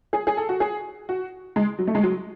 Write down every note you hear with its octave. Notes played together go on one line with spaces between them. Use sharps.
G#4
G#4
A4
F#4
G#4
F#4
G#3
F#3
A3
G#3
F#3